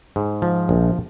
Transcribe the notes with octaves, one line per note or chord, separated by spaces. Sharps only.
G#2
F3
A#1